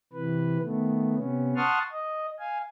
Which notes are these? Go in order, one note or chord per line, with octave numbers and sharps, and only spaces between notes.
C3 E3 B4
D#3 A3 B3
C3 B3 C#4
F#5 A5 C6 C#6 D#6 F6
D#5
F5 G#5